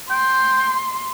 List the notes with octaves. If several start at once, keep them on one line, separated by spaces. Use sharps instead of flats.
G5 C6